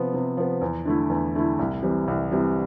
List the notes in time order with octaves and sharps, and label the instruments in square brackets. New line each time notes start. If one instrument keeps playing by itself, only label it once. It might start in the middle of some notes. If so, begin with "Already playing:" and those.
Already playing: [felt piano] C3 F3 B3
C3
F3 B3
E2
D3 A3 E4
E2
D3 A3 E4
C2
C3 E3 G3
C2
C3 E3 G3